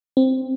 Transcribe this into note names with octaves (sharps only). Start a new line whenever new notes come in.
C4